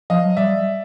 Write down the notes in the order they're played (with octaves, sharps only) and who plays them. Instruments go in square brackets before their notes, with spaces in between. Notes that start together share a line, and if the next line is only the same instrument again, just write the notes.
[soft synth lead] F3 [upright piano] D#5 F5
[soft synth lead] F#3
[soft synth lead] G3 [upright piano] D5 E5